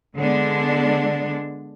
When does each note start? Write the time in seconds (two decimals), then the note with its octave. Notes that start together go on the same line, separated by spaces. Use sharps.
0.15 D3 G#3 B3 D4